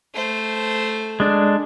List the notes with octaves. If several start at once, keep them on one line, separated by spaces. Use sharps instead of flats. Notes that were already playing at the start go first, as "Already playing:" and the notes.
A3 C5
G#3 D4